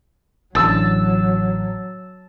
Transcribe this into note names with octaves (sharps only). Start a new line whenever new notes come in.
A1 D3 F#3 A5 E6